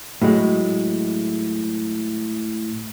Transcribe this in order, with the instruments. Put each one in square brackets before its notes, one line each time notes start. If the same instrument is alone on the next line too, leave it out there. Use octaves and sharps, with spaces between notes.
[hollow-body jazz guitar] A2 F#3 G#3